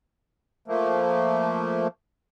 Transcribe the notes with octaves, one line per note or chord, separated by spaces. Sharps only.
F3 A3 A#3